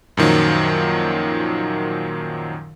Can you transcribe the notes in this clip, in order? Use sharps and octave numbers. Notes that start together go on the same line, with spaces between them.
F#2 A#2 D#3 F3 F#3